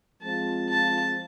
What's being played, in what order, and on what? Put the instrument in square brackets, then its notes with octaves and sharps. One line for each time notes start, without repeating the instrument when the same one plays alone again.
[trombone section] F3 G#3 C4 F4 [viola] A5
[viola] A5